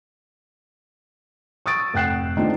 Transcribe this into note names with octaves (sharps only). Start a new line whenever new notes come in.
C#6 D#6 E6 A6 D7
F1 F#5 G5 F#6 C7 E7
D#3 A3 C4 D4 D#4 F4